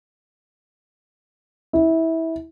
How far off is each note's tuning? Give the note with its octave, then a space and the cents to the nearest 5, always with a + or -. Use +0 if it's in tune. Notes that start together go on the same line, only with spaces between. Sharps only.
E4 -20